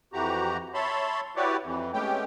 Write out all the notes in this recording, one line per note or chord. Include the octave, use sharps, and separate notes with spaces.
F2 E3 F#4 G4 A#5
C#5 E5 A5 B5 C6
E4 F#4 G4 B4 C#5 D5
F2 E3
G#3 A3 B3 C#4 G4 G5